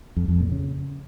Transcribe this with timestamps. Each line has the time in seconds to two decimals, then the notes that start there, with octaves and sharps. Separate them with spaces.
0.16 F2
0.28 F2
0.40 A#2
0.52 C#3